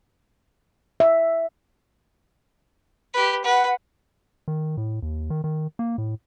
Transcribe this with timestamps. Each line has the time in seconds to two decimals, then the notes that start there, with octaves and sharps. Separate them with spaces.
1.00 E5
3.14 G4 B4
3.44 B4 F#5
4.48 D#3
4.77 A2
5.02 D#2
5.30 D#3
5.44 D#3
5.79 A#3
5.98 A2